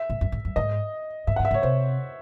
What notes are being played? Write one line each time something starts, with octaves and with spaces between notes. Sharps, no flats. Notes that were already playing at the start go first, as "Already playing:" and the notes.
Already playing: E5
A2
F#2
G#2
F#2
G#2 D#5
G#2 E5
F#5
G#2
E5
A2
C#5
C3 C5